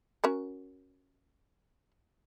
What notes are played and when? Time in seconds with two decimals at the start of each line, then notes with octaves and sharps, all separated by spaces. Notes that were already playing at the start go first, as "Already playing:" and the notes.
0.24 C#4 F#4 A#4